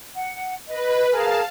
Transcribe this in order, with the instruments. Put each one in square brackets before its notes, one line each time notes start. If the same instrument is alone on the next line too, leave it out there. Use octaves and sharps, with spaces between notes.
[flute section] F#5
[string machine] B4 [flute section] D#5
[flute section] G#4 A#4 [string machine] F5 A5